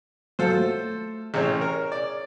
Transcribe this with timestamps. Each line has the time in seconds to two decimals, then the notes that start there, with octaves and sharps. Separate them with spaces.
0.39 F#3 F4 A4 C5
0.57 A3
1.34 A1 C3 G#4 C#5
1.61 A#4
1.92 D5